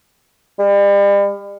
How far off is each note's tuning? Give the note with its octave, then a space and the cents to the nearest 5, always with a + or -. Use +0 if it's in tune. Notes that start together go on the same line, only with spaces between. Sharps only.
G3 +40